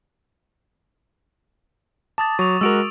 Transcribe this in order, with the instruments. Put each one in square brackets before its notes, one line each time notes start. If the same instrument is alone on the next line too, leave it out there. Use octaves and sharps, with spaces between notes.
[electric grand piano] A5 [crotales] D6 D#6 A6
[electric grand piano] F#3 [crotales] C#6 F7
[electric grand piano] G#3 F#4 A#4 [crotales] E6 D7 F7